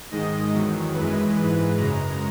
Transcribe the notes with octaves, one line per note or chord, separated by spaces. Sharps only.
G#2 D#3 G#3 D#5
E2 D#3 F#3
F#2 E3 G#3 B4
G#2 E3 G#3 B4
F#2 C#3 G#3 A#5